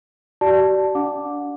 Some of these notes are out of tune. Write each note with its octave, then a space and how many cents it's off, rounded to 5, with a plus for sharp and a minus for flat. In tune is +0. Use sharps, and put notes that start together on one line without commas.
G4 -45 D5 +0 A5 +0
D4 -25 F#5 -35 D6 +0